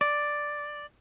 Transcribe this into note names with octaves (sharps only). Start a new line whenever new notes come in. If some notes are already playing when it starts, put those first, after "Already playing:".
D5